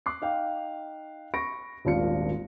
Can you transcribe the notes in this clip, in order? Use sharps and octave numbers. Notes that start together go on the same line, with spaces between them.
D6 F#6 C7
D#4 F5 G5
B5 C#6 A#6 D7
D#1 G#1 D4 F4 F5 C#7